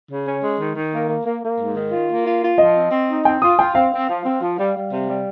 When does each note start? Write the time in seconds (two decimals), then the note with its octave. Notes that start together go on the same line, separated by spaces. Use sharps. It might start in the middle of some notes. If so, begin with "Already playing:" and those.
0.09 C#3
0.25 C#4
0.41 G#3
0.58 D#3
0.75 D#3
0.92 A#3
1.08 A#3
1.25 A#3
1.42 A#3
1.58 G#2
1.76 D#3
1.91 F4
2.09 A#3
2.26 F4
2.42 F4
2.58 F3 D#5
2.75 C4
2.91 C4
3.08 D#4
3.25 C4 G5
3.42 F4 D#6
3.58 F4 G5
3.75 C4 F5
3.92 C4
4.09 F3
4.25 C4
4.41 F3
4.58 G3
4.75 G3
4.91 C3
5.08 G3